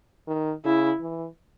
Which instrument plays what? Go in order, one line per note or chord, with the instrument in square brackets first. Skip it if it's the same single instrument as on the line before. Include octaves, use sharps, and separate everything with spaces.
[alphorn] D#3
[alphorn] C#3 [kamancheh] E4
[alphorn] E3